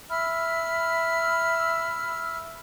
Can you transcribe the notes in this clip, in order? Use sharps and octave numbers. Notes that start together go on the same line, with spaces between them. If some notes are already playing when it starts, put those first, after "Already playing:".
E5 B5 E6 F6